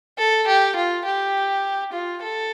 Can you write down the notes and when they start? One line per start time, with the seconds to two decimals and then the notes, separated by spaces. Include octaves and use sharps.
0.18 A4
0.47 G4
0.76 F4
1.05 G4
1.93 F4
2.22 A4